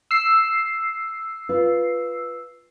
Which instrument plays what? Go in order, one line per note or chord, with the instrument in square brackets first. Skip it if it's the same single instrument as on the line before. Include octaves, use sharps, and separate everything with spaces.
[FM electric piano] E6 C7
[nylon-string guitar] F4 B4